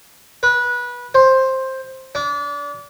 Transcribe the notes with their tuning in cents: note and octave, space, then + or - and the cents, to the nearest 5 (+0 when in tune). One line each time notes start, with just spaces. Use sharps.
B4 -20
C5 +10
D4 -30